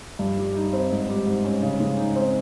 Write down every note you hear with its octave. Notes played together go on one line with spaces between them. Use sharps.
G2
G3
D#4
C4
G#2
G3
G#2
C#4
C#3
G#3
D#4
C4